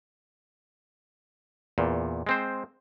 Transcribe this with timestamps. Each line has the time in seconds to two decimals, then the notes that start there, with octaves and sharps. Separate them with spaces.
1.78 E2 A#2
2.27 G#3 C4 C5